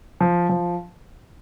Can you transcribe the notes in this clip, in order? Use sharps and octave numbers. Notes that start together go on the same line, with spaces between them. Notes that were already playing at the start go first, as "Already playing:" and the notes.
F3
F3